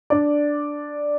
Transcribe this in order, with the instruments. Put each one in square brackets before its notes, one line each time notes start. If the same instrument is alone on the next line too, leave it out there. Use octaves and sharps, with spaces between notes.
[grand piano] D4 D5